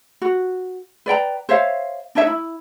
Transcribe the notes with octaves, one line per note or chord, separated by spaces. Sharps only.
F#4
B4 D5 G5 A#5
C5 C#5 E5 F5
D4 D#4 C#5 E5
E4